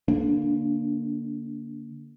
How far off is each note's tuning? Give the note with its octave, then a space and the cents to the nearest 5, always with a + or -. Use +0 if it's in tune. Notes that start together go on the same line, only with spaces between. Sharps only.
D3 -30 A#3 +0 D4 +0